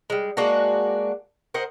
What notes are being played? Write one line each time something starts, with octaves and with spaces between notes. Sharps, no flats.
G3 G#3
G#3 A#3 D4 F#4
A#4 C5 D#5 F#5